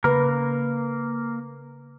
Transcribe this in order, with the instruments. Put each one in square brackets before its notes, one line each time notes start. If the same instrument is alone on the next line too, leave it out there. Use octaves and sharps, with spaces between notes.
[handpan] C#3 B4 [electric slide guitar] A#3 A#4